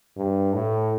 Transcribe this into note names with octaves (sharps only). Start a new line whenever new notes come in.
G2
A2